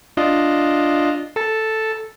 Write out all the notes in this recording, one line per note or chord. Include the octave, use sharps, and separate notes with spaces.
D4 F4 D#5
A4 A5